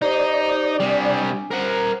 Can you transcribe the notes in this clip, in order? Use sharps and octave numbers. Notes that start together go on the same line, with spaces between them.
D#4 G4 C5 D5
C3 G3 D4 G#5
A#4 C5 F#5